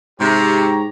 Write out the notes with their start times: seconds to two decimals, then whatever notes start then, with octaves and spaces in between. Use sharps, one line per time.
0.20 G#2 C3 G4 C#5 A#5